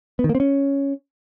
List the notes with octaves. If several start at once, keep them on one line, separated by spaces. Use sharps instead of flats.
B3
D#3
A#3
C4
C#4